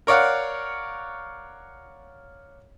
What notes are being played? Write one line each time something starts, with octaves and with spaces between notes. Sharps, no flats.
A#4 C#5 D5 F5 F#5